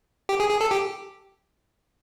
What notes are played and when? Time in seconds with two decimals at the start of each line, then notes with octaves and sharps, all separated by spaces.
0.29 G4
0.40 G#4
0.50 G#4
0.61 A4
0.71 G4